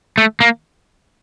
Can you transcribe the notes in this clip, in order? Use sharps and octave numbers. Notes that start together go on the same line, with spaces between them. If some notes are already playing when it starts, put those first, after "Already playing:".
A3
A#3